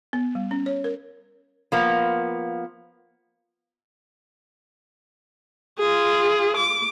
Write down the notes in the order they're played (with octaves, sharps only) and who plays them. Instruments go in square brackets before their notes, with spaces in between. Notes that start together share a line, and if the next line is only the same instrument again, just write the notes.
[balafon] B3
G3
C#4
C#5
A#4
[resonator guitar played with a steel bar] F3 A#3 B3
[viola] F4 G#4
D6